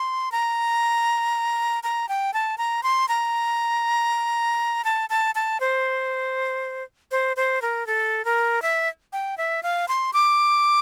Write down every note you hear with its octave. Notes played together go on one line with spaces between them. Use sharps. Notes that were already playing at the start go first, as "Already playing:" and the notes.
Already playing: C6
A#5
A#5
G5
A5
A#5
C6
A#5
A5
A5
A5
C5
C5
C5
A#4
A4
A#4
E5
G5
E5
F5
C6
D6